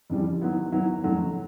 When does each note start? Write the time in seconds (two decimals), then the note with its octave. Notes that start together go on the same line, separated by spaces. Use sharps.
0.10 F2 C#3 E3 G3
0.41 D#3 F#3 B3 E4
0.72 D#3 F#3 B3 E4
1.03 F2 C#3 F#3 A3